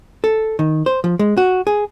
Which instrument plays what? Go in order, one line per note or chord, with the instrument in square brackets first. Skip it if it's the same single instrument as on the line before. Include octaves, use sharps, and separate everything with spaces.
[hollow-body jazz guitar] A4
D#3
C5
F3
G#3
F#4
G#4